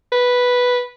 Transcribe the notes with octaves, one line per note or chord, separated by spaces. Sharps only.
B4